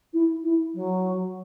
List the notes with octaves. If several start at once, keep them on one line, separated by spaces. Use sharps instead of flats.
E4
E4
F#3